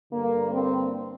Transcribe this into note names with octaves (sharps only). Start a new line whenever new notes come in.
G2 D3 A#3
C4